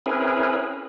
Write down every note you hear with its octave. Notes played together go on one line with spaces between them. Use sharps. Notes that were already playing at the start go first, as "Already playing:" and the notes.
C4 C#4 E4 G#4 A#4 B4